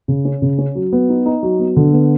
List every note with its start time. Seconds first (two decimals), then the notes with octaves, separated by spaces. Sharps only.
0.08 C#3
0.25 C#4
0.42 C#3
0.58 C#4
0.75 F#3
0.93 B3
1.09 D#4
1.26 D#4
1.43 F#3
1.59 B3
1.76 D3
1.93 B3